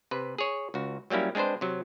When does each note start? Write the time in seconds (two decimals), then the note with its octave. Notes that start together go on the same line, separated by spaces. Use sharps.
0.11 C3 B4
0.38 G#4 C#5
0.74 C#2 F#4
1.10 F#3 G3 A#3 C#4 E4
1.35 G#3 C4 D4 B4 C5
1.61 C3 F#3